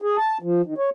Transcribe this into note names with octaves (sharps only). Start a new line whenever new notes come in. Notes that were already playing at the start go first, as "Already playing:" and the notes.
G#4
A5
F3
D#3
C#5